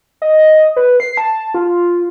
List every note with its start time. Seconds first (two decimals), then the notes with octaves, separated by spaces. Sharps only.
0.22 D#5
0.76 B4
1.00 C7
1.17 A5
1.54 F4